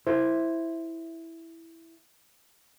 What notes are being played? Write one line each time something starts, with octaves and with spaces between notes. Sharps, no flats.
E4 C5